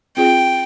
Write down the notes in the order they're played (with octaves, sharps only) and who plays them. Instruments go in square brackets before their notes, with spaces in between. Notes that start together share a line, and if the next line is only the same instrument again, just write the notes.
[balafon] C4 F4 G#4 C5 [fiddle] G5